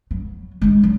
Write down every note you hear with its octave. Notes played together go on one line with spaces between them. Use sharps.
F#3
G#3 D#4
F#3